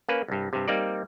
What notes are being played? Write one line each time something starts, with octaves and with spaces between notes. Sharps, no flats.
A#3 C#4 B4
C2 G2
G2 C3
G3 A#3 C4 D#4 D5